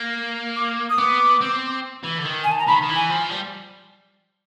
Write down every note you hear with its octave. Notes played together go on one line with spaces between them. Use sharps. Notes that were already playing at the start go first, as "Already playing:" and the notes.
Already playing: A#3
D6
D#6
B3 D6
C4
E3
D3
D#3
G#5
A5
A#5
D#3 B5
D#3
E3
G#5
F3
G3